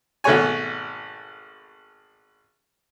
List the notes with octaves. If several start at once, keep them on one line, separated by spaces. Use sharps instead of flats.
G#1 B2 A3 C#5 G#5